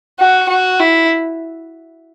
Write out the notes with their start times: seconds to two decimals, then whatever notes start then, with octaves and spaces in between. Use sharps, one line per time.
0.19 F#4
0.49 F#4
0.80 E4